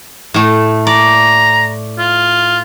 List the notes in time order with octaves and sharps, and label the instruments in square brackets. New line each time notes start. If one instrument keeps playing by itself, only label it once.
[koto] A2 A3
[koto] D5 [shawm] A#5
[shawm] F4